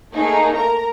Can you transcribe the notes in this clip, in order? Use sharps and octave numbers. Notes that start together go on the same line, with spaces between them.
A3 A#3 D#4 G#4
A#4 A#5